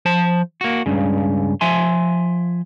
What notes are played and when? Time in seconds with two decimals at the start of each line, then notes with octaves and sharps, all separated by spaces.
0.05 F3 C5 A5
0.61 A#3 F#4
0.86 C#2 G2 C#3
1.61 F3 E5 G#5 C6